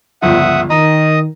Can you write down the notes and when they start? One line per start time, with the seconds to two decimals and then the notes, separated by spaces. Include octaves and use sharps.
0.22 G1 C#2 F3 E5 F#5 D#6
0.70 D#3 D#5 A#5 D#6